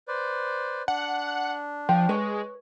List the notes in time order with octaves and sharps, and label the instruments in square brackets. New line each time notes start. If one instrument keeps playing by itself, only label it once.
[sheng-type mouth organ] B4 C5 D5
[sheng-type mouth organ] D4 [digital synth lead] F#5
[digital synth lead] F3 [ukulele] G5
[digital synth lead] G#3 [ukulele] B4 C#5